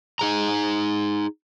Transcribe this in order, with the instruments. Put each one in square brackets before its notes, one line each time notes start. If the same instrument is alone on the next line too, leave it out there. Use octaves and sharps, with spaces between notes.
[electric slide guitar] D#4 G#4 A#5